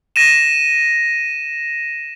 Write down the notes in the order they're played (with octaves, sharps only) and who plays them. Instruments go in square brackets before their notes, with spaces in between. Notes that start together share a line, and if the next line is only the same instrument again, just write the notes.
[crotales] A#6 D#7 E7